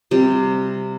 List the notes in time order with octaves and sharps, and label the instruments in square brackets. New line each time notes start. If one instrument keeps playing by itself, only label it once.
[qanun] C3 G3